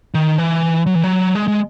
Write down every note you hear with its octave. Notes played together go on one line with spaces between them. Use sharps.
D#3
E3
F#3
E3
F#3
G#3
G#3